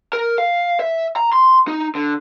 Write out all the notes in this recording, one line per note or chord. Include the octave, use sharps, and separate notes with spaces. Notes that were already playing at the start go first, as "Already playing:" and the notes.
A#4
F5
E5
A#5
C6
D#4
D3